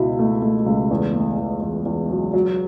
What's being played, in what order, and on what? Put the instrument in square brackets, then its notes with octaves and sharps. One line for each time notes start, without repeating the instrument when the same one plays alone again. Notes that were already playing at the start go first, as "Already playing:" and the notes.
Already playing: [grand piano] C#2 B2 E4
A3
A3
C#2
E2
A3
E2
E2
E2
F#3
F#3